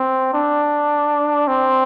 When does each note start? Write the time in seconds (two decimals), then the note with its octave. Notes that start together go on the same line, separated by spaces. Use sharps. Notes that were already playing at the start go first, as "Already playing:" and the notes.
Already playing: C4
0.34 D4
1.47 C4